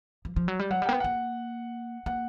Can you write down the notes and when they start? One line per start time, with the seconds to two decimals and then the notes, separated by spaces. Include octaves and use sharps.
0.25 F3
0.36 F3
0.48 F#3
0.59 G3
0.71 F#3 F#5
0.82 G3
0.86 A#3 G5
0.93 B3
1.00 A#3 F#5
2.06 A#3 F#5